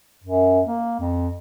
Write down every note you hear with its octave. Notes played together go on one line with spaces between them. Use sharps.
F#2
A#3
F2